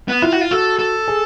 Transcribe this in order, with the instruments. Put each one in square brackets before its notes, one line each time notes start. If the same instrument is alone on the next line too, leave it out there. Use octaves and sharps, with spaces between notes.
[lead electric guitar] B3
[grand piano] E4 [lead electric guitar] F4
[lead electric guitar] F#4
F4
[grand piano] F#4 [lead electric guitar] A4
[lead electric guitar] A4
[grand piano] G#4